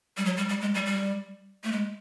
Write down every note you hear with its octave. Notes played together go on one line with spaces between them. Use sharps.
G3
F#3
G3
G3
G#3
G3
G3
A3
G#3